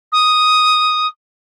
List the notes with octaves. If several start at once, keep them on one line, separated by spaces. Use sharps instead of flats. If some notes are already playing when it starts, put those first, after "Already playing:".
D#6